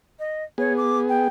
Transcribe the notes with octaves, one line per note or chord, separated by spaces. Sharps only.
D#5
B3 G#4 C#5
D6
G5